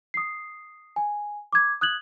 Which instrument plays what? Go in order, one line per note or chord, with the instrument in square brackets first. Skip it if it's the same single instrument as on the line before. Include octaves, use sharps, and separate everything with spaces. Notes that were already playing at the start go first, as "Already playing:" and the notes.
[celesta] D#6 C7
G#5
D6 G#6
D#6 F#6 G#6 F#7